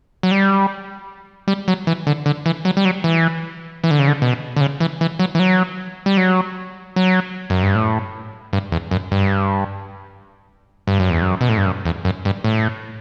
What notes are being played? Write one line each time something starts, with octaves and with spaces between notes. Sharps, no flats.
F#3
G3
G3
F#3
E3
D3
D3
E3
F#3
G3
F#3
E3
E3
D3
C#3
D3
B2
D3
C#3
E3
E3
F#3
E3
F#3
G3
F#3
F#3
F#2
G2
A2
G2
E2
F#2
G2
G2
F#2
E2
F#2
B2
A2
G2
F#2
E2
F#2
G2
A2